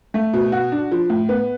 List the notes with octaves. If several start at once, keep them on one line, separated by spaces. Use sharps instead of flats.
A3
B2
F#4
D4
F3
A2
B3